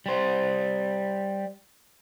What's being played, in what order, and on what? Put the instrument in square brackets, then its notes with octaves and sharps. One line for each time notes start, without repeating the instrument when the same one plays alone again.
[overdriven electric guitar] G3 C5